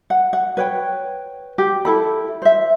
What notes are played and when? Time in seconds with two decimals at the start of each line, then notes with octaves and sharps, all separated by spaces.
0.10 F#5
0.33 F#5
0.57 B4 C#5 G5
1.58 G4
1.85 E4 A4 B5
2.42 C5 E5